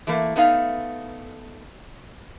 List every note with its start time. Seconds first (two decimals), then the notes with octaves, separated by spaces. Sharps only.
0.07 E3 A3 A#3
0.36 A3 B3 D#4 F5